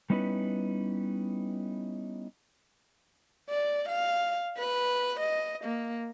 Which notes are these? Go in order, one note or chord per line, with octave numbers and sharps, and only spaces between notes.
G3 B3 C#4 D#4 E4 B4
D5
F5
B4
D#5
A#3